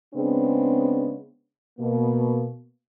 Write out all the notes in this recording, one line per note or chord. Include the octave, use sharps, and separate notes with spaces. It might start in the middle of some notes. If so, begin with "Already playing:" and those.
C#3 G#3 B3 C4 D4
B2 A#3